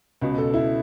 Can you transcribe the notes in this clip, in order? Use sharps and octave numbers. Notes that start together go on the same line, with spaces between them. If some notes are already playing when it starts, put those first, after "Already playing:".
C#2 B2
A4
E4